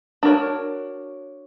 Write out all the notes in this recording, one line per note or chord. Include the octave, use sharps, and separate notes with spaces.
D4 F#4 A#4 C#5